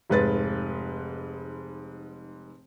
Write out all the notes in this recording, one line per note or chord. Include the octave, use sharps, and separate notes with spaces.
F1 G#2 B4 A6